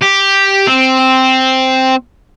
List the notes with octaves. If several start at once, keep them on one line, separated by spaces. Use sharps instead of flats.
G4
C4